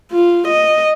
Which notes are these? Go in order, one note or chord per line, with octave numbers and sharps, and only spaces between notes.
F4
D#5